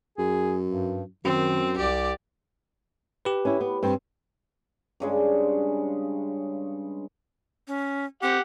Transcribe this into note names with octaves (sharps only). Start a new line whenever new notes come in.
F#2 G#4
G2
F#2 D#3 C4
C2 G4 D5
G4 B4
C#4 E4
B3
G2 C4
G2 C#3 G#3
C#4
C4 G4 F#5